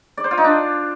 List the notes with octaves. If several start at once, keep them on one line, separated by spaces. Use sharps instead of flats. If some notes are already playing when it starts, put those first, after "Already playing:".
D5
C5
F4
D#4
D4